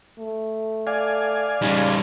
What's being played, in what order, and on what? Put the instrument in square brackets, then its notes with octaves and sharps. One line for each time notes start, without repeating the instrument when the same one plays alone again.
[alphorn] A3
[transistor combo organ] D5 F5 G#5
[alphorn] C#3 [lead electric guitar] G3 D#4